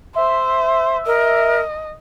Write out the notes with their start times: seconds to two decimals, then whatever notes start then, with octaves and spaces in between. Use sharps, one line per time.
0.16 C5 E5
1.06 A#4 D#5